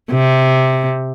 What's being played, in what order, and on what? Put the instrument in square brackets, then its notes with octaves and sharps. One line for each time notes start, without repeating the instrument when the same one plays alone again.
[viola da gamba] C3